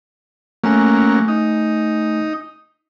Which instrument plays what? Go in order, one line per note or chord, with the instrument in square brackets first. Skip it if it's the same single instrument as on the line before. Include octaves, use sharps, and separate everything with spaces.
[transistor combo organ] F#3 A#3 C#4 [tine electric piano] A3 G#5
[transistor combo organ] D#4